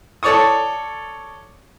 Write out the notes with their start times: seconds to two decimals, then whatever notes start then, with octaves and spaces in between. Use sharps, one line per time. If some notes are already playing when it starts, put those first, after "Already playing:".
0.23 A4 C#5 D5 C#6 D#6